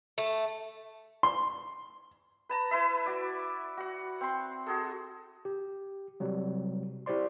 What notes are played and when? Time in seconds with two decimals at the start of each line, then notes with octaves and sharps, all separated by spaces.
0.18 A3
1.23 C6
2.49 B4 A5 A#5
2.71 E4 B4 E5
3.06 F#4 D5
3.77 F#4 F#5
4.21 C4 C6
4.66 F#4 G#4 A4
5.45 G4
6.20 C3 F#3 G3
7.06 E4 G4 C5 D5 C6